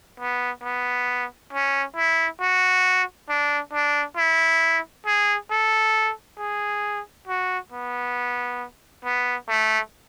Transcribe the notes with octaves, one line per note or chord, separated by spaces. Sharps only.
B3
B3
C#4
E4
F#4
D4
D4
E4
G#4
A4
G#4
F#4
B3
B3
A3